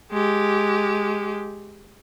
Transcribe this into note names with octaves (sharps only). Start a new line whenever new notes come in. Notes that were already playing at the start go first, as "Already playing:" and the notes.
G#3 G4